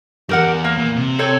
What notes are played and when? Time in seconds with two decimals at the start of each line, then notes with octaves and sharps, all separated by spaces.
0.29 E2 G2 G4 A#4 F#5
0.64 A#3
0.78 A#2
0.96 C3
1.19 C4 A4 C#5